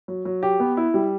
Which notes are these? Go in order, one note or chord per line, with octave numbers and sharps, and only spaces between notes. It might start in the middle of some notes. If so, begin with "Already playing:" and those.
F#3
F#3
G4
B3
E4
G3